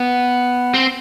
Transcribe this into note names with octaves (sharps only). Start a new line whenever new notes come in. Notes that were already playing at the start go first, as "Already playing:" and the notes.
Already playing: B3
C4